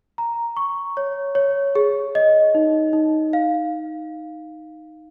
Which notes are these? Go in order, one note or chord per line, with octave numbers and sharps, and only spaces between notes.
A#5
C#6
C#5
C#5
G#4
D#5
D#4
D#4
F5